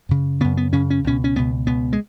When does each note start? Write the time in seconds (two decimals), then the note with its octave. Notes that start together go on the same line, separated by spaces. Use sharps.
0.09 F#2 C#3
0.40 F#2 C#3 B3
0.57 B3
0.72 F#2 C#3 C#4
0.90 C#4
1.04 C#2 B2 C#4
1.24 C#4
1.36 C#2 B2 B3
1.67 C#2 B2 B3
1.93 G#3